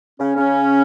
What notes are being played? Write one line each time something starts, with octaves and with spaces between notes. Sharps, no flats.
C#3 C#4
C#3 C#4